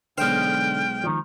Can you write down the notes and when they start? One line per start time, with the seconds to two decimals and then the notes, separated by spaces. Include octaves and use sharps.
0.18 B1 D3 G#3 C5 G5 F6
1.04 D#3 F3